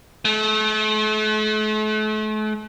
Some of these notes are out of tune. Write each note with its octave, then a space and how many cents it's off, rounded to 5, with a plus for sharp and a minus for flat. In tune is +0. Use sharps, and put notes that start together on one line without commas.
A3 -40